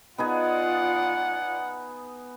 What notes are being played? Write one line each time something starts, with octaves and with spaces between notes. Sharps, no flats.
B3 D#4 F4 G#4 D5 F#5